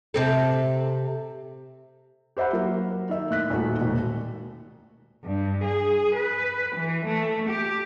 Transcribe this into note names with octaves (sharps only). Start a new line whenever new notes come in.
C3 C4 A4
G4 C5 E5 F#5 B5
F#3 A#3 A#4
D#3 E5
A2 F#6 B6
D#1 D#3 A3 F#4
E1 D#2
G2
G#4
B4
E3
A3
G4